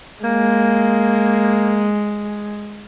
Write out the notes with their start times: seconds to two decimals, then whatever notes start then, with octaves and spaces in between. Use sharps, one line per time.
0.24 G#3 A#3